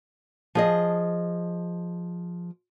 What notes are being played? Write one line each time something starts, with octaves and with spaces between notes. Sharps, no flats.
F3 G#4 D#5